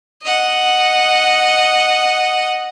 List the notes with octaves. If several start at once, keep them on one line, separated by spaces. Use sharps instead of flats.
D#5 F#5